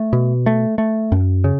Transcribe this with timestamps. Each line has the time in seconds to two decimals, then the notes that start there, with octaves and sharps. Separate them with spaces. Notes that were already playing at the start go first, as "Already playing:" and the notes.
Already playing: A3
0.13 B2
0.46 A3
0.78 A3
1.12 F#2
1.44 C#3